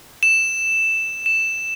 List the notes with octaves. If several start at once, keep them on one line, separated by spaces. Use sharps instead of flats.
E7
E7